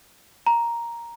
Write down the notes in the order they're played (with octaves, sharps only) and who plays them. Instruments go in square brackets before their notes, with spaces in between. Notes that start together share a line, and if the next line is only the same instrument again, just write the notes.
[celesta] A#5